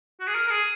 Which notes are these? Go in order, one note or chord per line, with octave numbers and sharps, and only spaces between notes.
F#4
G#4
A#4
A#4
G#4